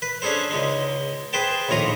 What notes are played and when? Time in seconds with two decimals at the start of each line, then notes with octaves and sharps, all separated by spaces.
0.02 B4
0.22 C#4 D4 G#4 A4 C5
0.51 C#2 G#3 D#4
1.33 G#4 B4 C5 G5 A5
1.69 A#1 D#2 A2 F4 A#5 D#6